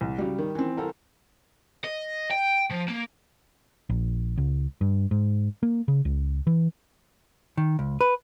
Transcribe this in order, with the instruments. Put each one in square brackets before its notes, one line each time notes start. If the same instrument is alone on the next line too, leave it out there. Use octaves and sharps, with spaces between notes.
[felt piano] C2
[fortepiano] C#3 F#3 [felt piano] G3
[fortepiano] D#3
[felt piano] E3 C4
[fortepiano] C2 A4 A#4
[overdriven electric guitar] D#5
G5
F3
A#3
[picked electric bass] A#1
C#2
G2
G#2
A#3
C#3
C#2
E3
[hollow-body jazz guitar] D#3
C#2
B4